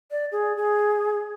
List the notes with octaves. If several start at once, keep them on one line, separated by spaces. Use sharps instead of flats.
D5
G#4
G#4